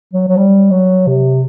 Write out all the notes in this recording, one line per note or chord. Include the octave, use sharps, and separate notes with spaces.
F#3
F#3
G3
F#3
C3